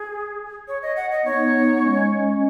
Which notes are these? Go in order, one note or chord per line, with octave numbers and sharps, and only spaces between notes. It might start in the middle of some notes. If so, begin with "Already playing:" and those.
Already playing: G#4
C#5
D#5
F#5
D#5
B3 D#4 C#5
G#3 C#4